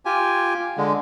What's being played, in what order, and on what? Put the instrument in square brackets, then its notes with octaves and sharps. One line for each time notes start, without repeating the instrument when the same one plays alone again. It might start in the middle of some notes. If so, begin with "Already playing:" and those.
[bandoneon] F4 G4 G#5
D3 G#3